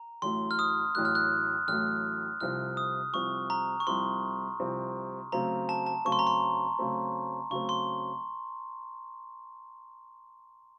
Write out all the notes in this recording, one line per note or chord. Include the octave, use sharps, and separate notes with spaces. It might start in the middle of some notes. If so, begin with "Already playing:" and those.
Already playing: A#5
A1 A2 F#3 A3 C6
F6
D#6
A1 A2 F#3 A3 F#6
F6
F#6
A1 A2 F#3 A3 F6
C2 C3 F3 C4 F6
D#6
C2 C3 F3 C4 C#6
A#5
C#6
C2 C3 F3 C4 C6
C2 C3 F3 C4
C#3 F#3 A3 C4 A#5
A5
A5
C#3 F#3 A3 C4 C#6
C6
A#5
C6
C#3 F#3 A3 C4
C#3 F#3 A3 C4 C#6
C6